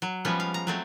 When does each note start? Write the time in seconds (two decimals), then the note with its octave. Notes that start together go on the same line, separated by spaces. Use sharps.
0.02 F#3
0.25 F3 G3 G#3 B3 C#4
0.40 F5
0.54 A#5
0.67 F#3 A3 C4